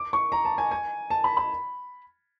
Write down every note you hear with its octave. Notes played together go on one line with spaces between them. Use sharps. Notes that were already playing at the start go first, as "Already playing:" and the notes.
Already playing: D6
C#6
A#5
A5
G#5
G#5
A5
B5
B5